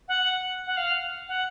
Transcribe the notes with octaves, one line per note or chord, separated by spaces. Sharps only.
F#5
F#5
F5
F#5